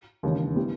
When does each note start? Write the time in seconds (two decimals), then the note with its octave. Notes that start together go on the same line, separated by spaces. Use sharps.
0.23 E1 D#2 C#3 E3
0.56 E3 G3 B3